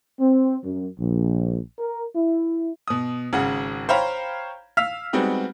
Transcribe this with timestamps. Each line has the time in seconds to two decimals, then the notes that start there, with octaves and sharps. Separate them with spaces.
0.19 C4
0.64 F#2
0.98 A#1
1.79 A#4
2.15 E4
2.88 B2 D#6
3.33 G#1 C#3 G#4 F#5
3.89 C5 C#5 F5 G5 A#5 B5
4.77 F5 E6 F6 B6 F7
5.13 G3 G#3 B3 C4 D#4 F#4